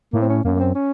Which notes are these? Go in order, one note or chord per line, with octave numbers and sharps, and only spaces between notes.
A2 A#3
C4
C#4
F#2 A#3
A#3
C4
C#4